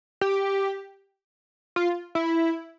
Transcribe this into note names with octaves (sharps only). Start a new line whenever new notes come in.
G4
F4
E4